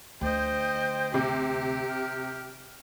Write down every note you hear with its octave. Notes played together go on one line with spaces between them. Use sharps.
D2 C5 D#5 G5
C3 G4
F6